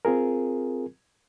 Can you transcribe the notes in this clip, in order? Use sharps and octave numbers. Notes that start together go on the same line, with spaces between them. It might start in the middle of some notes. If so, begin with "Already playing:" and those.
C4 F4 G#4 A#4